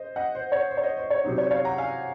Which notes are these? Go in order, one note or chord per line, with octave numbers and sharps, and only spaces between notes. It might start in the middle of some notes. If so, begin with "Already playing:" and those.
Already playing: C5 D#5
D#5 F#5
C5
C#5
C5
C#5
C5 D#5
C5 D#5
C#5
C3 F#3 C4 D#4 C5
C#5
C#5 F5
F#5 A#5
F5 G#5